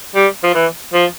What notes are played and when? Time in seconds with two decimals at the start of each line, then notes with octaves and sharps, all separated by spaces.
0.15 G3
0.43 F3
0.54 E3
0.94 F3